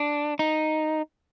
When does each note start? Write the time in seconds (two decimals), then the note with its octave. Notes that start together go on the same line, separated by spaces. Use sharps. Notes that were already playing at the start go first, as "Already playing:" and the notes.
Already playing: D4
0.39 D#4